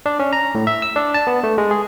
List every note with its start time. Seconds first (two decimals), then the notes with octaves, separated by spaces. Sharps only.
0.06 D4
0.19 C#4
0.33 A#5
0.55 A2
0.67 E5
0.82 E6
0.96 D4
1.14 A5
1.27 B3
1.43 A3
1.58 G#3
1.71 G#4